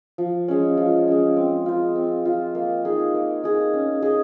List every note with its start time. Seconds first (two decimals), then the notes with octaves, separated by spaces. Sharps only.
0.18 F3
0.48 G#3 C#4
0.77 F3
1.08 G#3 C#4
1.36 C4
1.66 F4 C5
1.95 C4
2.25 F4 C5
2.55 A#3
2.85 D#4 G#4
3.14 A#3
3.44 D#4 G#4
3.73 C#4
4.02 G#4 D#5